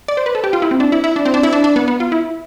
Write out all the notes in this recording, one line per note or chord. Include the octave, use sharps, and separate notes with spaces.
D5
C5
B4
A4
G4
F4
E4
C4
D4
E4
E4
D4
C4
D4
E4
D4
D4
B3
B3
F4
E4